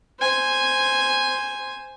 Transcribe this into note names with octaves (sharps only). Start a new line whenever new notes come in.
C5 G#5